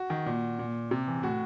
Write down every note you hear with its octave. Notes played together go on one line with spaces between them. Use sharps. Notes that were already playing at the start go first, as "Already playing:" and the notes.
Already playing: F#4
D#3
A#2
A#2
C3
E3
A2 F#4